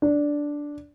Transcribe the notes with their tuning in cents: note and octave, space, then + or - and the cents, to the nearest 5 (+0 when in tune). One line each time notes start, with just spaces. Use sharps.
D4 -5